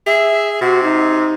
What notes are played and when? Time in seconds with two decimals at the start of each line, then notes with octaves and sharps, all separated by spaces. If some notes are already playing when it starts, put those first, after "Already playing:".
0.07 G#4 E5
0.61 C3 F#4
0.83 D#4